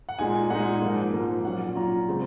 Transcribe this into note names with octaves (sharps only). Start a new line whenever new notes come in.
F#5
A#2 G#3 D#4 G#5
A#2 G#3 D#4 F#5
G#2 F3 A#3
G#2 F3 A#3
A#2 F#3 C#4 F4 F#5
A#2 F#3 C#4 F4 A#5
C#3 G#3 C4